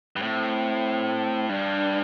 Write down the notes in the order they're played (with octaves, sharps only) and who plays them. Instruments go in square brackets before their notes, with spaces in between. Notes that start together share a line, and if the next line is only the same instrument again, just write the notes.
[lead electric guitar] G2
[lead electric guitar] A2 [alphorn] C4
[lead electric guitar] G2 [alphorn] D4